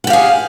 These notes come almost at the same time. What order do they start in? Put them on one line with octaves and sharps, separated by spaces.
F#5 G4 F5 G#4